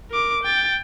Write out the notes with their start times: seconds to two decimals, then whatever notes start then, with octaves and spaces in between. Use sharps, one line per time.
0.10 A#4 D6
0.43 G5 A6